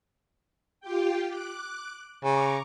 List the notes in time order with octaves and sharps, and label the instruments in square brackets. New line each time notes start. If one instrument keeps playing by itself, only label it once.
[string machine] F4 G4 G5
D6 F#6
[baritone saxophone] C#3 [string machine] A#5 C#6 D6